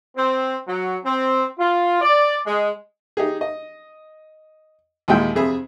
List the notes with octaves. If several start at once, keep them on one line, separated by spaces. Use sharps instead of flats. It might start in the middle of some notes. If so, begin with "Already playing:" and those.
C4
F#3
C4
F4
D5
G#3
D#4 G4 G#4
D#5
D#2 A#2 G#3 E4 G5
F2 C3 G#4 E5 B5